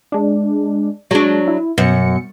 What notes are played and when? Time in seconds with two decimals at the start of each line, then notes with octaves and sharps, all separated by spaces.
0.12 G#3 D4
1.11 F#3 G#3 D4
1.47 E4
1.78 F#2 B2 C#7